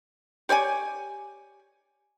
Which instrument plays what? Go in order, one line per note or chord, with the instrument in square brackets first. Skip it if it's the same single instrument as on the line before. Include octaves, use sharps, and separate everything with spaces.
[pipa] G4 C#5 D5 G#5